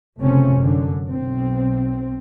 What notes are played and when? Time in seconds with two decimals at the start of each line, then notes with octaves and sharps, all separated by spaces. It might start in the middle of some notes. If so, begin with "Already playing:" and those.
0.20 F1 C#3 A3 C4 C#4
0.54 F#2 D3
1.09 B1 C4